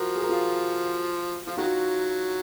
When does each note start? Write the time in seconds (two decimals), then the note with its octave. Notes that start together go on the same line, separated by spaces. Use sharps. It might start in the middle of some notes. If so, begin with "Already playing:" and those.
Already playing: F3 F#4 A#4
0.16 G#4
0.22 A#4
0.29 F4 G#4
1.47 F3 F4
1.57 D#3 F#3 D#4 F#4